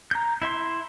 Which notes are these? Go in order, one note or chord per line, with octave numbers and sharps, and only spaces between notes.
A#5 G6
E4 E5 C6